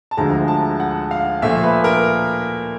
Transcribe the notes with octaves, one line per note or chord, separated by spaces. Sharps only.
A5
D2 D3 F3 G#3 A#5
A5
F#5
F5
A#2 F3 A3 E5
B4
A#4